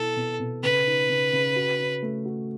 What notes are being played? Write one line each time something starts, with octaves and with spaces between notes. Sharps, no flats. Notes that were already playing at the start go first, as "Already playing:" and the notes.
Already playing: B2 E4 A4
B2
B2
C#3 B4
D#4
C#3
C#3
F#4
C#4
A3
F#4